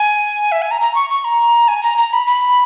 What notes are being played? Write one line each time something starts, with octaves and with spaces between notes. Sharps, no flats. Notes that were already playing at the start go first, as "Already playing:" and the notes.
Already playing: G#5
E5
G#5
A#5
A#5
C#6
C#6
A#5
G#5
A#5
A#5
B5
B5